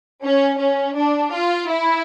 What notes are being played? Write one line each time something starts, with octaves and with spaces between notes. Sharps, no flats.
C#4
C#4
D4
F4
E4